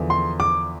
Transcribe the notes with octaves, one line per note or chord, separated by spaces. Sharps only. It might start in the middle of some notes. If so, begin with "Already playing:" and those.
Already playing: E2 D3 F3
C6
D6